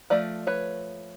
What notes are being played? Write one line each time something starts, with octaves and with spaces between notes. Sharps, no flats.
F3 A3 D5
B4 C#5